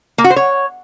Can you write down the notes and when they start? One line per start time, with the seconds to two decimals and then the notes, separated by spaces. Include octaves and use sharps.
0.18 A#3
0.24 F#4
0.30 C5
0.36 C#5